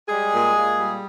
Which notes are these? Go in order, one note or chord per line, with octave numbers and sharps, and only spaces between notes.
G3 G#3 G#4
A#2
A#2
G3